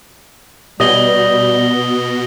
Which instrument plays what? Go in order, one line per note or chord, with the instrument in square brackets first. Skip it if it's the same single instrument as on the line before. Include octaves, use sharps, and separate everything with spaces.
[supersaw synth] B2 [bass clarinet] G3 [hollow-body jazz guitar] G4 C#5 D#5 [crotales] D#6 A#6 G7